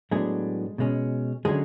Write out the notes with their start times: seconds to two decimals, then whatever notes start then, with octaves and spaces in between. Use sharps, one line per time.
0.11 A2 F#3 G#3 B3 D4 G#4
0.78 B2 G#3 C#4
1.45 D3 F#3 G#3 C#4 G#4